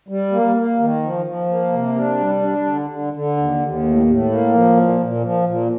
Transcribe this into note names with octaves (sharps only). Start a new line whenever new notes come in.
G3
A#3
A#3
D#3
F3
F3
A#3
C3
D4
G3
D4
D3
D3
D3
D#2
D#2
A2
A2
A#3
F3
A#2
A#2
F3
A#2